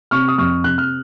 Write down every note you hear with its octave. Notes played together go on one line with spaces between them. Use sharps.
C3 C#6 F6
D#6
F2 C#6 F6
C3 F#6
F6